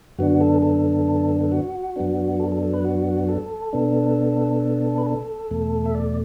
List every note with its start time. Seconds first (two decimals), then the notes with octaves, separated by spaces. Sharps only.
0.18 F#2 D3 B3 D4 F#4
0.41 A4
0.62 A4
1.40 A4
1.52 F#4
1.96 F#2 F#3 B3 D4
2.40 A4
2.52 A4
2.63 A4
2.73 B4
2.84 F#4
3.29 A4
3.73 B2 B3 D4
4.98 B4
5.06 A4
5.51 E2 B2 A3
5.86 E5
5.94 D5